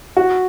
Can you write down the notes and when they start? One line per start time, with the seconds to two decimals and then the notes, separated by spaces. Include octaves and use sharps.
0.17 F#4